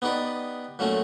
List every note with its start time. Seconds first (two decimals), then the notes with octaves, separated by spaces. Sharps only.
0.02 B3 D#4 G4 B4 D5
0.79 A#2 F#3 A3 C#4 F#4